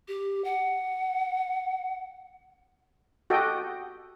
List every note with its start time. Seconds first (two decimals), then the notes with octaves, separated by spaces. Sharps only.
0.08 G4
0.44 F#5
3.30 F#4 G4 A4 D#5 G5